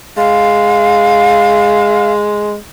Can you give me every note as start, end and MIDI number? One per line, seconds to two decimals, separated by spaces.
0.17 2.56 56
0.17 2.12 77